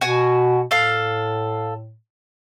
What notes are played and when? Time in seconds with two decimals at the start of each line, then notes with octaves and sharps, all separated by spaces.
0.01 B2 F#4 G#5
0.71 A2 A4 F5